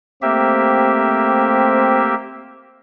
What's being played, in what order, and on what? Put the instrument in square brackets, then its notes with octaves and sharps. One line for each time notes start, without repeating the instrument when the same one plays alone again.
[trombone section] A3 C4 [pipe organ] A#3 G4 E5